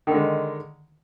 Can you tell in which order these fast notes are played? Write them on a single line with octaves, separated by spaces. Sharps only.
D#3 D3 G#3